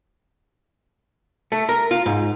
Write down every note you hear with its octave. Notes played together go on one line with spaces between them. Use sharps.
A3
A#4
F4
G#2